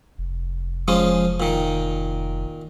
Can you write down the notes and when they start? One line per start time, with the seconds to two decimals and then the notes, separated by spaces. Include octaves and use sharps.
0.18 F1
0.88 F3 G#3 C#4
1.40 A#2 D#3